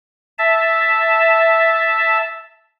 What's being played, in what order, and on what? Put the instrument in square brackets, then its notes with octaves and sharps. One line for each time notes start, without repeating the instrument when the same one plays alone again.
[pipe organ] E5 A5